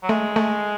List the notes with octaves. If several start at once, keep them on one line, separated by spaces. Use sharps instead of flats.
F#3
G#3 A3
A3